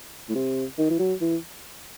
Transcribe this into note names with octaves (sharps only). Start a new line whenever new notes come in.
A2
C3
D#3
E3
F#3
E3